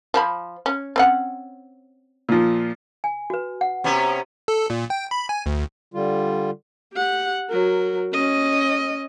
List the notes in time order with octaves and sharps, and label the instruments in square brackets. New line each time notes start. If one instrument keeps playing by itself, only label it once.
[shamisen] F3 C5 B5
C#4
C4 C#4 F#5
[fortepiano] A#2 F3
[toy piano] G#5
F#4 B4
F#5
[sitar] C3 B3 C#4
[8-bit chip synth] A4
A#2
G5
B5
G#5
D2
[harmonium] D3 G3 F4
[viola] G4 F#5
F#3 A#4
C#4 D#5